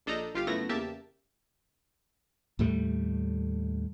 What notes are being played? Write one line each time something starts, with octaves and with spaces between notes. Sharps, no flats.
A#1 D4 A4 D#5 A#5 G6
G1 F4 G4 F5
C#2 F#2 A3 B3 E4 A#6
E2 C#3 A#3 G4 E5 A5
D#2 A2 G3 A3